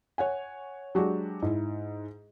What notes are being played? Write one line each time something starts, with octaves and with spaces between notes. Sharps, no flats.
C#5 F#5 G#5
F#3 G#3 D4 F#4 G4
G#2 E4